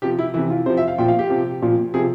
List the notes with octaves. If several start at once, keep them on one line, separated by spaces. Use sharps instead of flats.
C3 F3 G4
E4
C3 E3 E4
F4
C3 F3 C5
E5
F5
A#2 F3 G5
F5
G4
C3 F3
A#2 F3
C3 F3 G#4